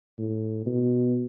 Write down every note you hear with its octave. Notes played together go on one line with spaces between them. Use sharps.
A2
B2